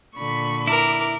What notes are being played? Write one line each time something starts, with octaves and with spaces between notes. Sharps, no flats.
A#2 D3 B5 C#6
E4 A#4 D6